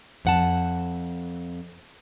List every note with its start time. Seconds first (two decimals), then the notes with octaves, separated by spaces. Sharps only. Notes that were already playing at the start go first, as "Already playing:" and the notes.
0.25 F2 F#5 A5